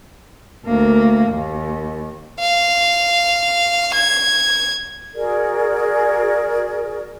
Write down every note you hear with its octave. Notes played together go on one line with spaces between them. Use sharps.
D2 A#3
D#2
F5
G#6
F#4 G#4 A#4 D5